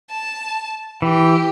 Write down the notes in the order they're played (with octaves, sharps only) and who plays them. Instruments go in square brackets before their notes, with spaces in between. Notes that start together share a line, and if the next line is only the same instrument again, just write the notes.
[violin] A5
[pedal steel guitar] E3 [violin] G4